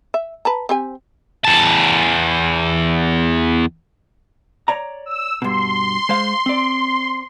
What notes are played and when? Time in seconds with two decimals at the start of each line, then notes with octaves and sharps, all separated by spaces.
0.14 E5
0.45 B4 A5 A#5
0.69 C4 G4 G#5
1.45 E2 A5
4.68 C#5 D5 A#5
5.06 E6
5.42 G2 B2 C6
6.09 G#3 C5 F5
6.46 C4 D5